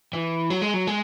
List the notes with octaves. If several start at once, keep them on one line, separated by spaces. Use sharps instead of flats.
E3
F#3
G#3
F#3
G#3